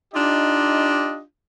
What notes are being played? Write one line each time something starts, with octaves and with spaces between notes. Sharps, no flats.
D4 D#4 F4 G4 D#5